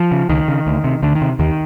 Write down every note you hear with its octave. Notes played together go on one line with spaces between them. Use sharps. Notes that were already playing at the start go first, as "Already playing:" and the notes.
Already playing: F3
C#3
C#2 D#3
C#3
D2
C3
D2 D3
D#3
C3
D#2 D#3